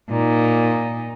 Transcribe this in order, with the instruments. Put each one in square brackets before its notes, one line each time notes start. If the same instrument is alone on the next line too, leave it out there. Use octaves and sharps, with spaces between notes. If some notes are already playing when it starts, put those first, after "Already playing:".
[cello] A#2 D#4